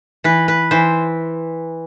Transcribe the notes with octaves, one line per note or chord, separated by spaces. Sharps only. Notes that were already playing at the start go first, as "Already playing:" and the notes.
E3 B4
B4
E3 C5